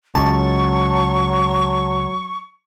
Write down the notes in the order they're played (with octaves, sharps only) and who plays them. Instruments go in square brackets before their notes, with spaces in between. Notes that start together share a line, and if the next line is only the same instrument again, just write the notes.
[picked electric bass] C#2 [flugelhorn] F#3 [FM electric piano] A5 [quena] C#6